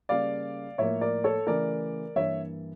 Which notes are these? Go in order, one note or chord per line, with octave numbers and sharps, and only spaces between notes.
C#3 G3 A#3 D5 F5
A2 F3 A#3 C#5 E5
A#4 D5
A4 C#5
C#3 E3 A3 A#4 D5
G2 E3 A#3 C#5 E5